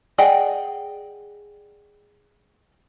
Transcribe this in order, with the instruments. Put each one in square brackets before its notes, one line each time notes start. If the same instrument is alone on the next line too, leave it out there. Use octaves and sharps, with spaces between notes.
[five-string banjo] G#4 D5 D#5 F#5 G5